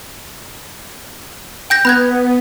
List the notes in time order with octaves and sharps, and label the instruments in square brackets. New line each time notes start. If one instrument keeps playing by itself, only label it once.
[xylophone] G5 G6 A#6
[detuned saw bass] B3 [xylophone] B5 F#6 G#6